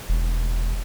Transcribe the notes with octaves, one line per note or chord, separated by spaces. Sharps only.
E1